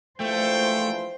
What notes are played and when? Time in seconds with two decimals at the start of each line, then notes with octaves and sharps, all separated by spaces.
0.20 A#1 E3 F3 A3 C5 G5